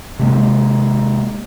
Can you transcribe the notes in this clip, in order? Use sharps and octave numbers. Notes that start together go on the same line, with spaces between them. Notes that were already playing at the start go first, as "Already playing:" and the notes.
C3 G#3 A#3